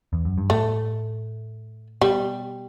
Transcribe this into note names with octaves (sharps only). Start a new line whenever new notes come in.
E2
F#2
G2
A2 A3
B2 G3